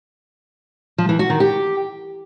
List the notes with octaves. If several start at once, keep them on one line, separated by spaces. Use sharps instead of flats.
F3
E3
F#4
D#3
G4